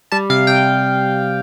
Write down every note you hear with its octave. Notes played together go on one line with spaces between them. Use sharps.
G3 A5
C3 F5
C3 G5